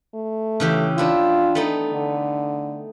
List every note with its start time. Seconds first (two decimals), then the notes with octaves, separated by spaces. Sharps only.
0.14 A3
0.60 C#3 E3 G4
0.98 B3 D4 E4 F4
1.55 A3 B3 D#4
1.93 D3